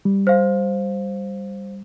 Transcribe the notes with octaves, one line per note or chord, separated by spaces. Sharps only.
G3
C5 F5